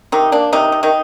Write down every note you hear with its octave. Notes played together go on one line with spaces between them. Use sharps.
C3 D#3 D#4
A#3 D4
C3 D#3 D#4
C3
D#3 D#4